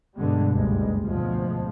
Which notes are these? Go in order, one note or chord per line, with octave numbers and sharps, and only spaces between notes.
G2 B2 D3 G3 G#3
F#1 C#2 F#2 G3 G#3
D2 G#2 B2 F3 G#3